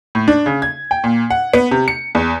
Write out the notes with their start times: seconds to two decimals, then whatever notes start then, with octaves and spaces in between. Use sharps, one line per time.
0.15 A2
0.28 D4
0.46 C#3
0.62 G#6
0.91 G5
1.04 A#2
1.30 F#5
1.54 B3
1.71 C3
1.88 C#7
2.15 E2